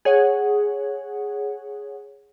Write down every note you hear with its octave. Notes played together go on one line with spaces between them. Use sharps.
G#4 C#5 F#5